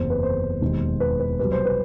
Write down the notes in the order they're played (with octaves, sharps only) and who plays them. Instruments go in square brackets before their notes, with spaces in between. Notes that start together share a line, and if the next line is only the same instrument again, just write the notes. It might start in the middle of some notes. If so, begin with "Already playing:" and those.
Already playing: [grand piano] F#1 E2 C3 C5
B4
C5
E1 D#2 D#3
B4
B4
C2 B2 F#3 B4
C5
B4